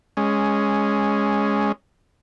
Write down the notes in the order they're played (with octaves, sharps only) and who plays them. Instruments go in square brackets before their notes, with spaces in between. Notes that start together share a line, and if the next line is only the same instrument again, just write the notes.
[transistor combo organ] G#3 C#4